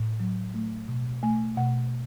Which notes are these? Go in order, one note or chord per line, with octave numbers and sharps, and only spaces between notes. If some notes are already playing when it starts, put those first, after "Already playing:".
Already playing: A2
F#3
A3
B2
A3 G#5
B2 F#5